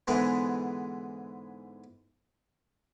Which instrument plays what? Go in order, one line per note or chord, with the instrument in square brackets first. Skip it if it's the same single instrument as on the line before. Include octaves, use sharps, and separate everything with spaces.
[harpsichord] G#2 D3 E3 G#3 B3